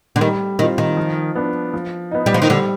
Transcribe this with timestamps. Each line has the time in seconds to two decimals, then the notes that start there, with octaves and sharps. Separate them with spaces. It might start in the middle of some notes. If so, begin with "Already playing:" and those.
0.16 D3
0.21 D#3 G3
0.59 D#3 C4
0.62 F4
0.78 D#3
0.97 F3
1.35 B3 D4
1.73 F3
2.11 B3 D#4
2.26 G3
2.34 F3
2.42 D#3
2.50 D3 G3